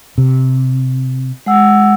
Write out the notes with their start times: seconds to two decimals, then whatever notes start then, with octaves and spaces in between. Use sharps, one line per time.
0.18 C3
1.46 G#3 F#5 E6